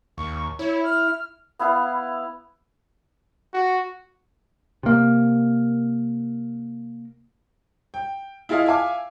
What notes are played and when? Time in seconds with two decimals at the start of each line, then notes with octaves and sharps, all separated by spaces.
0.18 D#2 C#6
0.59 E4 C#5
0.84 F6
1.59 B3 E4 B4 F5
3.54 F#4
4.83 C3 A#3
7.94 G5
8.49 E4 F4 G#4 D#5 F5
8.66 E5 F5 G#5 D6